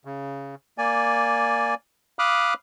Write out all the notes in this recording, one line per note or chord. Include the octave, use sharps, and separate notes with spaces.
C#3
A#3 D5 G#5
F5 B5 D6 D#6 F6 F#6